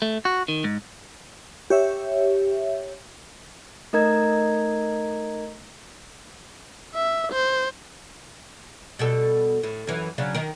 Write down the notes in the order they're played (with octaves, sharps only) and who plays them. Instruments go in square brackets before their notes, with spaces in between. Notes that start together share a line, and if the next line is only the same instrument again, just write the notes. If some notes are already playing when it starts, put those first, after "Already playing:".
[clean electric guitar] A3
F#4
D#3
G#2
[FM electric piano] G4 C#5 E5
[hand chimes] A3 D#4 A#4 D#5 A#5 G#6
[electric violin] E5
C5
[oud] B2 G3 A4
A2
F#2 E3
C#3 F#3 D4
D#3 A#4